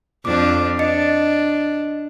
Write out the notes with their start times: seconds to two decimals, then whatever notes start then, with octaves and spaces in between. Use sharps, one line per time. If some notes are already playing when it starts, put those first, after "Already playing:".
0.25 F2 D4 D6
0.79 D4 D#5 A6 C#7